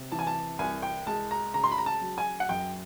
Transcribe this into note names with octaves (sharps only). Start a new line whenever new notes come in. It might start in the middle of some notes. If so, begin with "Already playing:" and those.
Already playing: C3
E3 A5
G#5
A5
C2 G#5
G5
G#3 A5
A#5
C#3 A#5
C6
B5
A#5
A5
F#3
G#5
F#5
F#2 G5